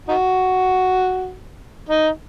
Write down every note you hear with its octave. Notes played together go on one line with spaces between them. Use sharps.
D#4 F#4
D#4